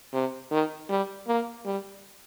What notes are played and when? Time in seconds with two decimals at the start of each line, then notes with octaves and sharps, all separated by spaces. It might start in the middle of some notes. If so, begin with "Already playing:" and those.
0.13 C3
0.51 D#3
0.89 G3
1.28 A#3
1.66 G3